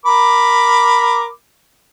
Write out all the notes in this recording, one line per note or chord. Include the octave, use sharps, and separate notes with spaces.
A#4 B5 D6